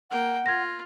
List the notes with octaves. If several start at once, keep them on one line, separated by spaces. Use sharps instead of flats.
A#3 F#5 G5
F4 G#6 A#6